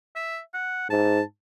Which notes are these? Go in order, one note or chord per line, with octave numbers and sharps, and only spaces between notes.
E5
F#5
G#2 A5